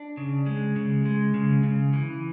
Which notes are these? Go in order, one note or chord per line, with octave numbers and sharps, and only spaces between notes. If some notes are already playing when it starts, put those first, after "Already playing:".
Already playing: D4
C#3
G#3
C#3
G#3
C#3
C#3
E3